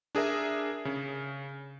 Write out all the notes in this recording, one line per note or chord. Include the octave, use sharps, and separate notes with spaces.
D4 G#4 A#4 E5
C#3